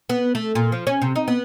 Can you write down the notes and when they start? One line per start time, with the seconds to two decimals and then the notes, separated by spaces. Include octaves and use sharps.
0.09 B3
0.35 A3
0.55 A#2
0.72 F3
0.87 C#4
1.02 C3
1.16 D#4
1.28 B3